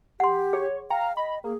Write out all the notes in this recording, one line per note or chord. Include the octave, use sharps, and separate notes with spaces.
G4 F#5 C6
G#4 C#5
F5 G5 A#5
D#5 B5
A#3 G#4